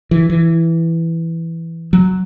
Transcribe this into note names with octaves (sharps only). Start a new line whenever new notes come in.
E3
E3
F#3